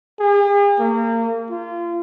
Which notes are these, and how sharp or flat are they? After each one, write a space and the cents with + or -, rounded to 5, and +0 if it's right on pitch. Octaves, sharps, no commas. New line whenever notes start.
G#4 -45
A#3 -30
F4 -30